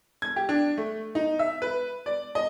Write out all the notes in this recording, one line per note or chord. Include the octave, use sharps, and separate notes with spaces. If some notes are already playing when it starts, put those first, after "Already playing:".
G#6
G4
D4
A3
D#4
E5
B4
D5
D#5